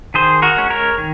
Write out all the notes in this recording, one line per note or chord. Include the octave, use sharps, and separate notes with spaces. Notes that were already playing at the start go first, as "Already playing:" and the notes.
D#3 G#4 C5
F#4 A#4
G#3 C#4
A#4 C#5
D#3